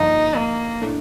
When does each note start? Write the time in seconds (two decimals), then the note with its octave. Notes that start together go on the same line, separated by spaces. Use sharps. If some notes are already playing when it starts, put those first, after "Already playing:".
Already playing: G2 D3 F3 A#3 D#4
0.36 A#3
0.81 A2 A3 D4